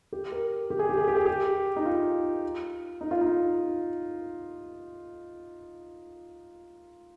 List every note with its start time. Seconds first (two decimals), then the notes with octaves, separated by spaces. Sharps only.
0.12 G4
0.32 A#4
0.70 G4
0.79 G#4
0.89 G4
0.98 G#4
1.08 G4
1.17 G#4
1.26 G4
1.76 D#4
1.85 F4
3.01 D#4
3.11 F4
3.21 D#4